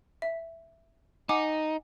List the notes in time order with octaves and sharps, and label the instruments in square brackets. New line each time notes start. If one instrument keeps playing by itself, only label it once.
[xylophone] E5
[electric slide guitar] D#4 [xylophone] F#5 G#5 D6